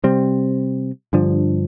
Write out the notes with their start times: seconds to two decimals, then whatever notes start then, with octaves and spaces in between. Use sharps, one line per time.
0.04 C3 G3 C4
1.13 G2 D3 F3